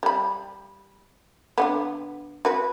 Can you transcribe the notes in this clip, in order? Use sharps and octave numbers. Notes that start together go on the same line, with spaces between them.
G3 B5
D3 D#3 B3
F#4 B4